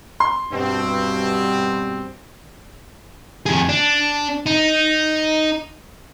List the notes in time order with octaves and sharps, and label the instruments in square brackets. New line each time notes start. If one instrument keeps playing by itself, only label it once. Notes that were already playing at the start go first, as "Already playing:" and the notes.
[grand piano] C6
[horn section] G2 B2 C4
[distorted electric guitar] F2 G#4
D4
D#4